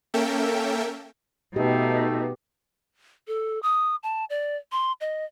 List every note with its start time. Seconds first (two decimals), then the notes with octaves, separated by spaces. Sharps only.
0.14 A#3 C#4 A4 A#4 E5 G5
1.56 B2 A3 D#4 G4 B4
3.28 A4
3.63 D#6
4.03 A5
4.30 D5
4.72 C6
5.01 D#5